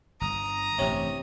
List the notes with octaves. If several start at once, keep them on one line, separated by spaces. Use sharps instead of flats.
G1 A#5 D#6
A1 G2 C3 C#4